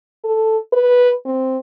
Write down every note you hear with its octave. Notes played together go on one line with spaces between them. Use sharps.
A4
B4
C4